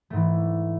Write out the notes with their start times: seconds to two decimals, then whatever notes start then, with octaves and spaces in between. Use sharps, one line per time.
0.10 A3
0.13 G#2
0.16 E3